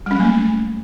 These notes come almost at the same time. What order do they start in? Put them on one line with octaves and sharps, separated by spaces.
G3 C#4 F#3 A#3 A3